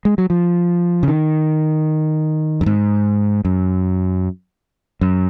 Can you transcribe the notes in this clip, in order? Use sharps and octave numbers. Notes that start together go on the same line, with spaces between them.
G#3
F#3
F3
C#3
D#3
F#2
G#2
F#2
F#2